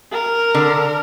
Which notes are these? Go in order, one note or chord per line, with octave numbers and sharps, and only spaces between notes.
A#4
D3